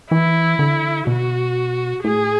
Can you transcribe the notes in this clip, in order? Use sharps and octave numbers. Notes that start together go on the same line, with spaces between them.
E3 E4
D3
B2 F#4
A2 G#4